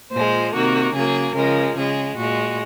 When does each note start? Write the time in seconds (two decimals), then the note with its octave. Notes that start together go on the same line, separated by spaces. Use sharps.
0.13 A#2 F3 G#3 C5
0.53 C3 D#3 A#3 F#4
0.94 C#3 F#3 A#3 G#4
1.35 C#3 F3 G#3 A#4
1.76 C#3 G#3 G#4
2.17 A#2 G#3 F#4